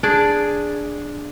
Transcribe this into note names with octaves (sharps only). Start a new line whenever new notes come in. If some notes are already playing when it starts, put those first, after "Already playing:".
D4 G#4 D5